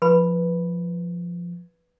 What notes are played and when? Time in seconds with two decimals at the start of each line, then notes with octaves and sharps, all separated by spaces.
0.02 F3 B4 B5